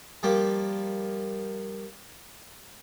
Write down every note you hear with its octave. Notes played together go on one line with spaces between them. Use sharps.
F3 G3 A#3 G4